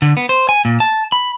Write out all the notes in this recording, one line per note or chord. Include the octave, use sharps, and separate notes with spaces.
D3
B3
C5
G#5
A#2
A5
B5